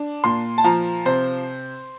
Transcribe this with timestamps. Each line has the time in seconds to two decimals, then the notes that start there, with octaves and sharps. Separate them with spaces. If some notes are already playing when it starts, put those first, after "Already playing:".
Already playing: D4
0.24 A#2 C6
0.58 A5
0.64 F3 A#5
1.05 C3 C5